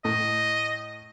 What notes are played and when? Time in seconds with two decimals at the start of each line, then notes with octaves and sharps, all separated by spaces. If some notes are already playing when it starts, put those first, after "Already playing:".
0.05 A2 D#5